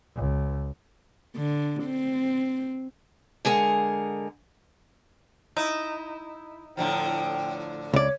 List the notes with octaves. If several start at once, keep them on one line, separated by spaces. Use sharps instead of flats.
C#2
D3
C4
D3 G#3 G#4 A#4 F#5
D#4 E4
A2 D3 F3 G5
C#2 C#5 D5